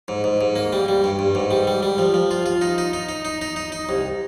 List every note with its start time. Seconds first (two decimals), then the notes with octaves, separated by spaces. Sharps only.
0.08 G#2
0.24 G#2
0.41 G#2
0.56 A#3
0.73 G3
0.88 G3
1.04 G2
1.19 G2
1.35 G#2
1.51 G3
1.67 G3
1.83 G3
1.98 F3
2.14 F3
2.31 F4
2.46 F4
2.61 D#4
2.78 D#4
2.93 D#4
3.09 D#4
3.25 D#4
3.41 D#4
3.56 D#4
3.72 D#4
3.89 C2